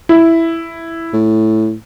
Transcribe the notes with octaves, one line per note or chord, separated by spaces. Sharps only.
E4
A2